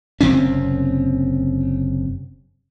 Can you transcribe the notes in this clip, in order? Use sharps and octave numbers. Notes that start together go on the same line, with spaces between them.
F#1 C3 C4 C#4